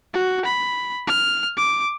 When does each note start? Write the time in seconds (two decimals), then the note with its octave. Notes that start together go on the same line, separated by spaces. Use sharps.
0.14 F#4
0.45 B5
1.07 F6
1.57 D6